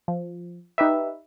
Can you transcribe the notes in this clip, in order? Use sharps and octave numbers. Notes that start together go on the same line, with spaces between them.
F3
D#4 G4 B4 E5